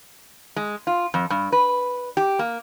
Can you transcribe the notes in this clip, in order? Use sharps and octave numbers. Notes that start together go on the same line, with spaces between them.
G#3
F4
F2
G2
B4
G4
A#3